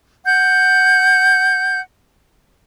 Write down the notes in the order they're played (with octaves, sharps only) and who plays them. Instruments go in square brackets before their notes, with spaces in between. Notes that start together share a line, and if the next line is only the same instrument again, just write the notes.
[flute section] F#5 G6